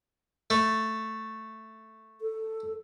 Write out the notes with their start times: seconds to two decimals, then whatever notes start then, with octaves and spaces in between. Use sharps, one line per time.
0.50 A3
2.21 A4